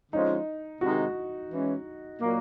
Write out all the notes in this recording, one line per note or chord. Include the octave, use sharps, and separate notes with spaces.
D3 F3 G#3 C#4 D#4 F4
C3 D#3 G#3 C4 D#4 F#4
E3 G#3 C#4
A#2 F#3 A#3